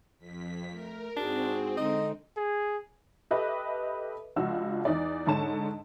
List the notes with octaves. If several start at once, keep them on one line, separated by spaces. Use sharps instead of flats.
F2 B6
A3 A#4
G#2 C4 D4 F#4 G#4
D3 G#3 D#4 D#5
G#4
G4 A4 B4 D#5 E5
C#2 F3 D4 F4 F#4 E6
E2 D#4 D5
G#2 D3 C#5 A5 E7